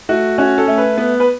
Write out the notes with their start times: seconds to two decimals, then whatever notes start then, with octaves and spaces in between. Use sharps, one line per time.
0.09 A3 F#4
0.38 C#4 F#4
0.58 A4
0.68 A3
0.78 B4
0.97 B3
1.20 B4